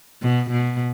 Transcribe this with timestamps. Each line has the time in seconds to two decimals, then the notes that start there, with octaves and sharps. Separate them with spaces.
0.22 B2
0.51 B2